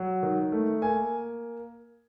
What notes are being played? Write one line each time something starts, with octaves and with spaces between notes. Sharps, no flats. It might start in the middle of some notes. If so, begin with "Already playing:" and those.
Already playing: F#3
D#3
A3
A#3 G#5